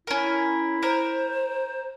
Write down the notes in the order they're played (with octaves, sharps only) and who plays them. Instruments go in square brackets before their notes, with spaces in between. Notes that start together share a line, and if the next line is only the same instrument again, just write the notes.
[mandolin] C#4 A#4 [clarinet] E4
[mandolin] A#4 [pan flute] C5